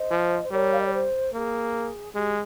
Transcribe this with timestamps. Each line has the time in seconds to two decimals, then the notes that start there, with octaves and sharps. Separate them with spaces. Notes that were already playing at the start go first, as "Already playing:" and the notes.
Already playing: C5 D#5
0.11 F3
0.43 C5
0.51 G3 A#4 C#5
0.71 F5
0.78 D#5
0.85 C#5
0.93 C5
1.33 A#3 G#4
2.15 G#3 G4